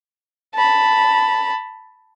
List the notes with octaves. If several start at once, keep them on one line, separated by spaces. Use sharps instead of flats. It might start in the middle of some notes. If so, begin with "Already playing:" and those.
A5 B5